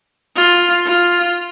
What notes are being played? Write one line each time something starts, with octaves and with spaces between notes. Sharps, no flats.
F4
F4